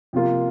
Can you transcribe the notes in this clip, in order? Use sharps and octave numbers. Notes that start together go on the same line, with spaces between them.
C3 F3 A#3 F4